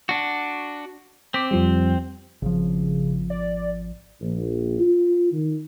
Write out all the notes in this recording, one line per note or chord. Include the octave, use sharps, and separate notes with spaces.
D4 F#4
C4 D6 B6
F2 F3 G3
G#1 C#3 F3
D5
A#1
F4
D#3